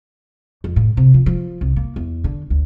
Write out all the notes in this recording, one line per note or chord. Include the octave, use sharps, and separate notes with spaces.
F2
A2
C3
F3
F3
C2
A#3
E2
D3
D2